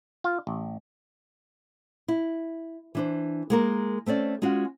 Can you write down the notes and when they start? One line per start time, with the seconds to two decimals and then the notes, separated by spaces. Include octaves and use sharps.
0.24 F4
0.47 A1
2.08 E4
2.95 E3 D4 C5
3.50 G#3 A#3 A#4
4.06 A3 C4 C#4 D5
4.42 G#3 C#4 F4 F#4